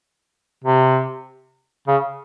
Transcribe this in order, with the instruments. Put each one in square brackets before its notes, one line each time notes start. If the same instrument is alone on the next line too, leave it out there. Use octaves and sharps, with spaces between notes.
[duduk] C3
C#3